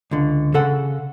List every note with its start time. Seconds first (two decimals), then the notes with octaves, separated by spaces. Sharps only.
0.11 C#2 D3
0.54 C#3 A4 F#5